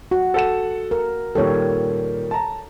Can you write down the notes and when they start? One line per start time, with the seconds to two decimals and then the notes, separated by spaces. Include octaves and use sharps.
0.11 F#4
0.34 A4 F#5 E7
0.91 A#4
1.35 A#2 D#3 G3 A4 C#5
2.31 A5 A#5